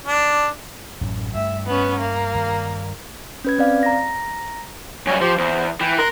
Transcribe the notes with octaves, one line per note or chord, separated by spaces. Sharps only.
D4
A1 F#2 A2
G2 A3 E5
B3 C#4
A#3
G2 D#3 G3
C#4 B4 G#6
C4 D5 F5
A#5 A#6
F#2 G3 C#5 G#5
F3 G4 C5
E2 C5
E3 G5
A#4 C6 F#6